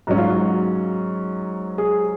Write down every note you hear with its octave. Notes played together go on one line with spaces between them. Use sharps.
G#2 F#3 C#4 F#4
F4
F#4
G#4